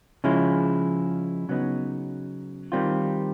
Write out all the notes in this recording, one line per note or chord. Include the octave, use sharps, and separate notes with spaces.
C#3 F3 G#3 C#4 E4
C#3 F#3 B3 D#4
D#3 G3 C4 F4